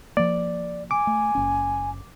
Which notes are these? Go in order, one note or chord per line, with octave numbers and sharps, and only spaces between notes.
F3 A#3 D5
G#5 D6
A3
F#1 C#4